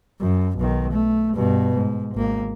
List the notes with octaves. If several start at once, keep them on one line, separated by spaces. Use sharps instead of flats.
F#2
B1 D#3
A3
G2 B2
G#2
G#1 A#3